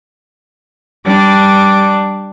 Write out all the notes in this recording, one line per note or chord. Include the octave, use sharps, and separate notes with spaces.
G3 D4 D6